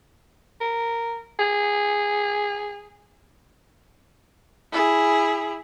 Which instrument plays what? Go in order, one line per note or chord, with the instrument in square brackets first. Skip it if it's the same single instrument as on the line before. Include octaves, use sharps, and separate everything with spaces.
[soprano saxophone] A#4
G#4
[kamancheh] E4 G#4